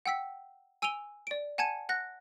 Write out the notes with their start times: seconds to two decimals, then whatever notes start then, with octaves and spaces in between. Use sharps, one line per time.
0.06 F#5 G5 E6 B6
0.82 G#5 E6 D7 D#7 F7 G7
1.27 D5 D7
1.58 F#5 G#5 A5 G#6 C#7 D#7
1.89 F#5 F#6 A#6